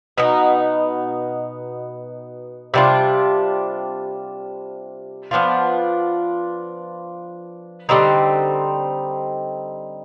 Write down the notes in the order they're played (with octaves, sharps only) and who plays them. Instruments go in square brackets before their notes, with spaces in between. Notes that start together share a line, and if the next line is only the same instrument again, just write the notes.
[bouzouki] B2 B3 D#4
C3 G3 D4 F4
F3 B3 D4 F4
D3 G3 C4 D#4